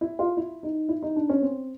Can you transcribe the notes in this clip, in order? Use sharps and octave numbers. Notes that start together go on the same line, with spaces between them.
E4
F4
E4
D#4
E4
D#4
D4
C#4
C4